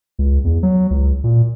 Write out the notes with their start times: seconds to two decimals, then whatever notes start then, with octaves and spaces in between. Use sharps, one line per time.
0.19 C#2
0.44 E2
0.63 F#3
0.90 C#2
1.24 A#2